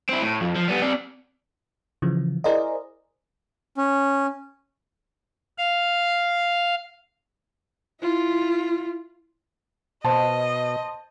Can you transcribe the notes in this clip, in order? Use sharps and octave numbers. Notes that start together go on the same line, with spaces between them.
C4 E4
A2
F2
F3
G3 B3
C4 D5
C#3 E3 F3
E4 G#4 A#4 C5 D5 D#5
C#4
F5
E4 F4
B2 C5 D#5 A5